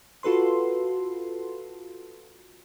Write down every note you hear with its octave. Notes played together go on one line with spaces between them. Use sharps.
F4 F#4 A4 B4 C6